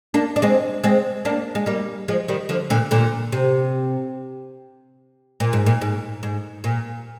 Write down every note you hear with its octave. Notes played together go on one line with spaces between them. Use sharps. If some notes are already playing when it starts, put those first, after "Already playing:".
A#3 D4
D4
G#3 C4
G#3 C4
A#3 D4
G#3
G3 A#3
F3 G#3
D#3 G3
D3 F3
A#2 D3
A#2 D3
C3
A#2
G#2
A#2
G#2
G#2
A#2